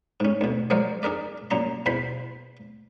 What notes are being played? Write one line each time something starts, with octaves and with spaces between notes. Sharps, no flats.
G#2 C#4
D2 B2
F3 F#3 G#3 A#4 C5 D5
D4 G#4 A#4 D5
F#2 A#2 A5 A#5 C6
E2 B2 C5 B5 C6